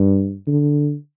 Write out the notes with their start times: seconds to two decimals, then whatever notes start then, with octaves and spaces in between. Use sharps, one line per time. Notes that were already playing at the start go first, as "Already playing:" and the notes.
Already playing: G2
0.47 D3